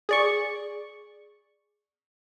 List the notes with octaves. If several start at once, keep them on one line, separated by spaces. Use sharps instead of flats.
G#4 D5 C#6